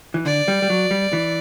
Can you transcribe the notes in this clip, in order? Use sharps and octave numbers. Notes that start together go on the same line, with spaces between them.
E3
D3 D5
G3
G3
F#3
G3
E3